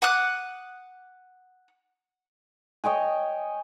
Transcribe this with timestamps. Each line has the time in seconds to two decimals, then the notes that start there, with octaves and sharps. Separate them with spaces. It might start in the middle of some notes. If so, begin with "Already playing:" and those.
0.02 F#5 D6 D#6 F#6
2.84 C#5 D#5 G5 G#5